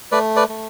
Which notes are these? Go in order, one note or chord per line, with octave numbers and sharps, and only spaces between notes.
A3 B4 D5
B4 D5
A3